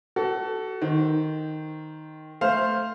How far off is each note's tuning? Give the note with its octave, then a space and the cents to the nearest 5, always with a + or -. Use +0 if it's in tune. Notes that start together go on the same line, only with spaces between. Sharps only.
F#4 +30 A4 +0
D#3 +0 C5 +0
A3 +0 C5 +0 F5 +0